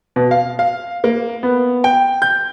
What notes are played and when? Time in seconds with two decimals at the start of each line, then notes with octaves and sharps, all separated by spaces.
0.16 B2
0.31 F5
0.59 F5
1.04 A#3
1.43 B3
1.84 G5
2.22 G6